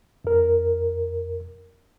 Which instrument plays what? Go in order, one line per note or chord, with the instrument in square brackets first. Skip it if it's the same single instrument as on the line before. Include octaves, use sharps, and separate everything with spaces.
[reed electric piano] F2 A#4